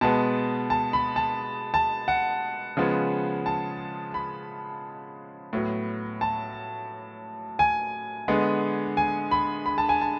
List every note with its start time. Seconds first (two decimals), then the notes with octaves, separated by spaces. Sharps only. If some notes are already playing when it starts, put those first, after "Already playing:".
0.01 B2 G#3 B3 A5
0.70 A5
0.93 B5
1.16 A5
1.74 A5
2.08 F#5
2.77 C#3 F3 G#3 B3
3.46 A5
4.14 B5
5.53 A2 F#3 B3
6.21 A5
7.59 G#5
8.28 D3 G#3 B3
8.97 G#5
9.31 B5
9.66 B5
9.78 A5
9.89 G#5
10.01 A5